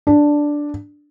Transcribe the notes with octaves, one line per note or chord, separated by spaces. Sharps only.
D4